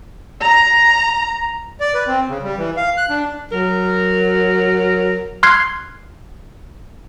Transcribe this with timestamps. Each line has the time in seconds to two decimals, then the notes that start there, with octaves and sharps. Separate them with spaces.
0.41 A#5
1.80 D5
1.94 B4
2.07 C4
2.29 C#3
2.43 G3
2.57 E3
2.77 F5
2.97 F#6
3.10 D4
3.52 F#3 A#4
5.43 C6 F6 F#6 G#6 C7